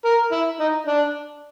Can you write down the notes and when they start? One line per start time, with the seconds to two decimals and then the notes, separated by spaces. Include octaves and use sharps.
0.05 A#4
0.32 E4
0.60 D#4
0.87 D4